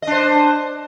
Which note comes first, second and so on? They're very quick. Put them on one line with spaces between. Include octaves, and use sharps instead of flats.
D#5 D4 C5